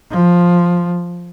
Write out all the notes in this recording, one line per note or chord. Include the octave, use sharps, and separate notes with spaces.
F3